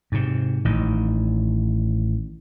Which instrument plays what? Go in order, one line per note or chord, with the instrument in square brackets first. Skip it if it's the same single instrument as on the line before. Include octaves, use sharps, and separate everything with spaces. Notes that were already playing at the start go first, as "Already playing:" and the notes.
[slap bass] G#2 C3
A1 D#3